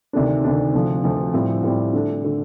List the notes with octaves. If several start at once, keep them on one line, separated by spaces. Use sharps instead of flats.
D2 C3 D#3 A3 D4
D2 C3 D#3 A3 D4
D2 C3 F3 A3
D2 C3 F3 A3
A2 G3 C4 F4
A2 G3 C4 F4
D3 A3 D4
D3 A3 D4